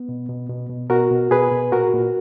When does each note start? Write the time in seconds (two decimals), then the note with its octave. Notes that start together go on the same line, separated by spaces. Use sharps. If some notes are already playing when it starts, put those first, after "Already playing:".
Already playing: B3
0.09 B2
0.29 B2
0.49 B2
0.69 B2
0.90 B2 F#4 A#4
1.11 B2
1.31 B2 G#4 B4
1.51 B2
1.72 A#2 F#4 A#4
1.93 A#2